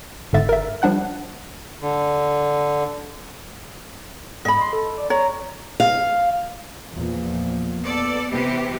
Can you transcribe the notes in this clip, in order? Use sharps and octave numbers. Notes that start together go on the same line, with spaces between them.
G1 G#2 D3 E5 A6
A#4 E5
F3 G3 D4 F#5 F#6
D3
G#2 D#5 B5
C6
A4
D5
C#5 A#5
F5
E2 A#2 F3
B3 A4 D5
C3 E3 G4